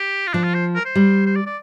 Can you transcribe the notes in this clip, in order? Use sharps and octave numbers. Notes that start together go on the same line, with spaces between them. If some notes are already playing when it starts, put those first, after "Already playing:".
Already playing: G4
F4
F3 D4
F4
C5
A#4
C5
G3
C5
D5
D5